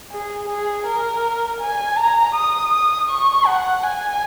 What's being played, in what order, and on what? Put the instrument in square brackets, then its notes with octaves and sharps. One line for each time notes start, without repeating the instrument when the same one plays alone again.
[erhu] G#4
G#4
A#4
G#5
A#5
D#6
C#6
F#5
G#5